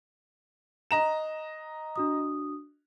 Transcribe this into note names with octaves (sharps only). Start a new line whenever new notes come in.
D#5 A#5 E7
D4 F#4 D#6